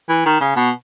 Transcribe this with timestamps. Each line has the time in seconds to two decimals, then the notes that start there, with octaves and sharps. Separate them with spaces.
0.09 E3
0.26 D#3
0.40 C#3
0.56 B2